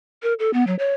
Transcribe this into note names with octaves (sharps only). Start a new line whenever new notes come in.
A#4
A4
B3
F#3
C#5